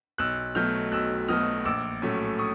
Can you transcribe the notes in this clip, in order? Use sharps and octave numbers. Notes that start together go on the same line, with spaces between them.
B1 E6 F#6
B2 F#3 A3 F6 G6
B1 E6 F#6
B2 F#3 A3 D#6 F6
A#1 D6 E6
A2 F#3 A3 C#4
C#6 D#6